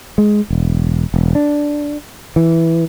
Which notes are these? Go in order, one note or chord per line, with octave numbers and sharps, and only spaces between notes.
G#3
E1
E1
D4
E3